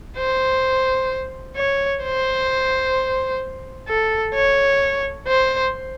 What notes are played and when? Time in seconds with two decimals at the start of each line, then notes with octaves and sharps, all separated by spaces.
0.18 C5
1.56 C#5
2.04 C5
3.88 A4
4.35 C#5
5.28 C5